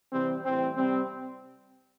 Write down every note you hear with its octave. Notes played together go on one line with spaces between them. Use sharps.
C3 E3 G3 C4
A2 E3 G3 C4
C3 G3 C4